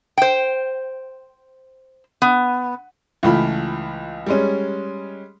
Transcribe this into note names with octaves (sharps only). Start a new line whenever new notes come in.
C5 G5
B3
C#2 E3 A3 F4 B5
G3 G#3 C#4